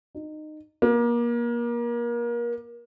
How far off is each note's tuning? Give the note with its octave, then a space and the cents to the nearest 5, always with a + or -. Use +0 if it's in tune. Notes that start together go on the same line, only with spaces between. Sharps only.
D#4 -20
A#3 +30